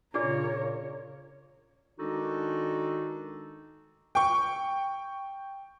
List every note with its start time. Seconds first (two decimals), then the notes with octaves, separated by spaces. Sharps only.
0.14 A#2 C#3 D4 F4 G#4 A#4 C#5 D5
1.99 D#3 G#3 D4 D#4 F#4 A4
4.15 G5 C#6